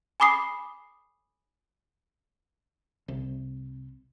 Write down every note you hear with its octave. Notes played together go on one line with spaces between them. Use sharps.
G#5 B5 D6 D#6 C7
C2